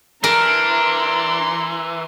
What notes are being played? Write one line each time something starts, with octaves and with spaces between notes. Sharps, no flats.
E3 D4 A#4 A#5 C6